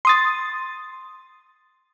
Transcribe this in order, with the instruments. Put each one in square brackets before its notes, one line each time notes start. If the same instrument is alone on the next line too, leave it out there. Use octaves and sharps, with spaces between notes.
[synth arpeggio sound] C6 D#6 A6